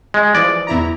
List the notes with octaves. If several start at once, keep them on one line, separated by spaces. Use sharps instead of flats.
G#3
E3 F3 D5
E2 E4 A#5